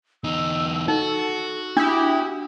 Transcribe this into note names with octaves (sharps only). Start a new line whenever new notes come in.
E2 D#4 E6
D#4 F#4 A4
D4 E4 G4 D#6